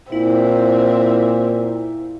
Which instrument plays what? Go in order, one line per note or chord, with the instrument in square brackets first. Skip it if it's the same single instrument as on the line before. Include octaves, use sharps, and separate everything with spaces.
[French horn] A#2 [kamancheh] C4 E5 [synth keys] E4